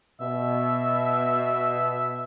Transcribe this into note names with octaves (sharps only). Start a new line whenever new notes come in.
B2 E5